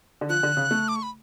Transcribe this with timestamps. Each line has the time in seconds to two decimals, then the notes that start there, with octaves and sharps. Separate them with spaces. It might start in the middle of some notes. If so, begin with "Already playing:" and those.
0.21 D3
0.29 F3 F#6
0.43 D3
0.57 C#3
0.71 A3
0.88 D6
0.96 C#6
1.03 B5